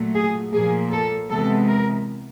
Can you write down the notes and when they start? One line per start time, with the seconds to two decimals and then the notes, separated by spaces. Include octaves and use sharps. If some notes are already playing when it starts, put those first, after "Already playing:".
Already playing: A#2 F#3 A3
0.15 G#4
0.53 A#2 F3 A#3 G#4
0.91 A4
1.30 C3 E3 G#3 B3 A4
1.68 A#4